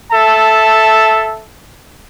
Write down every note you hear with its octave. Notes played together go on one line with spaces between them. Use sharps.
A4 E5 A5